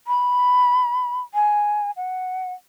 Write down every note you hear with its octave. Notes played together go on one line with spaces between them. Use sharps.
B5
G#5
F#5